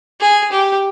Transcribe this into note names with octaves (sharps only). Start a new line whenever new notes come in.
G#4
G4